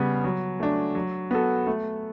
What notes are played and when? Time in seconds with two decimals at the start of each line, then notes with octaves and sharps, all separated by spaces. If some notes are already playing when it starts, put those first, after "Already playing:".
Already playing: C#3 G3 B3
0.24 F#3
0.60 A3 D4
0.95 F#3
1.31 B3 F#4 A4
1.66 A3